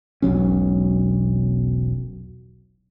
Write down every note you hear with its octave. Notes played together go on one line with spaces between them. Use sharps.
E1 B1 F#3 C#4